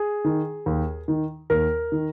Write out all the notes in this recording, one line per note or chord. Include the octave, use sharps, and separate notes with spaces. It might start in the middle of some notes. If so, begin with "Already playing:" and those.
Already playing: G#4
D#3
D#2
D#3
D#2 A#4
D#3